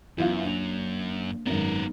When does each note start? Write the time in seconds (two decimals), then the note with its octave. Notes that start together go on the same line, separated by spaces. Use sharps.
0.18 F#2 E3 B3 E4 F4
0.43 A#3 D4 F7
1.46 G#1 F#2 B3 D#4 A#4